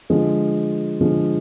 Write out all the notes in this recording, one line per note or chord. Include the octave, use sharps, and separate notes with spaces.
D3 F3 G#3
D3 F3 G#3